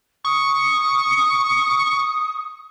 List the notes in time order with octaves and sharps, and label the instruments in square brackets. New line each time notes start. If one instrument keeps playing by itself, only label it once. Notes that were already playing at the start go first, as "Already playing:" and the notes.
[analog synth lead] C#6 [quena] D#6